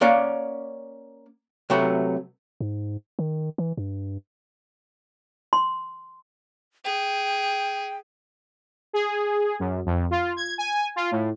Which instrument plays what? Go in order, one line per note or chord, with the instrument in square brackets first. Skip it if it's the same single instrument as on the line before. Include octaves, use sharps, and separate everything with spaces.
[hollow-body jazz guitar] A#3 C#4 D5 F5 F#5
C3 F#3 A3 F#4 B4
[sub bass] G#2
D#3
E3
G2
[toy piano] C6
[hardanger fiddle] G#4 [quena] G5
[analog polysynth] G#4
F#2
F2
F4
G#6
G#5
F4
A2